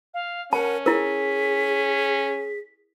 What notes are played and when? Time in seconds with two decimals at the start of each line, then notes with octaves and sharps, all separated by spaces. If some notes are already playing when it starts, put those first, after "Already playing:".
0.14 F5
0.53 C#4 A#4 F#5 A5
0.86 E4 G#4 A#4 B6